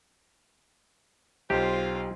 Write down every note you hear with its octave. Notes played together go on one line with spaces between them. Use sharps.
B1 F4 G4 C5